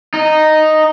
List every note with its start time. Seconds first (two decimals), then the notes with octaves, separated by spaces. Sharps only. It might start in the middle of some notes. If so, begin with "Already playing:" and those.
0.14 D#4